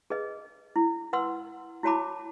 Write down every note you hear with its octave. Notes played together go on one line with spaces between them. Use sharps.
G#4 B4 D#5
E4
B4 F#5 C6 E6
E4 F#4 C#5 A5 B5 D6